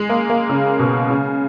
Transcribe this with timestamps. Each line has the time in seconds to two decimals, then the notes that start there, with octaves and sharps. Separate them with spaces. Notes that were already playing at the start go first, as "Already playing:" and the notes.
Already playing: G#3
0.09 A#3
0.30 A#3
0.49 C#3
0.79 B2
1.10 C#3